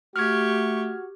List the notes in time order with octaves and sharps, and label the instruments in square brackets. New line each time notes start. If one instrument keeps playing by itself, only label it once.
[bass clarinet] A3 [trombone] F#4 [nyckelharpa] G4 C#6 [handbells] F6 G#6